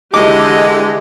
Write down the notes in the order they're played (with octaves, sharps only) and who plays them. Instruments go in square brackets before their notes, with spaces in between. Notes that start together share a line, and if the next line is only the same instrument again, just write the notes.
[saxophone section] D3 G#3 [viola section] E3 G4 [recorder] D#5 [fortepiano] D6